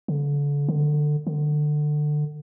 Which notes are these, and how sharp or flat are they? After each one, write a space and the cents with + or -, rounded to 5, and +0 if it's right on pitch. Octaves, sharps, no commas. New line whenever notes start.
D3 -35
D3 +20
D3 +25